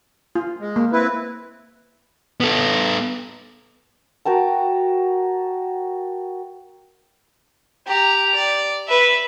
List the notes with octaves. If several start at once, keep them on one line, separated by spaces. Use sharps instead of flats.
F4
G#3
A#3
C4 E4 B4
B3 A4
F#4 A#4 G5 A5
G4 A#5
D5
B4 E5